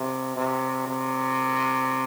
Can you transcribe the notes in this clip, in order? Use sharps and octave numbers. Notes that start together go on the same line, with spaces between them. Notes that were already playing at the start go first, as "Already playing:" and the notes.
Already playing: C3
C3
C3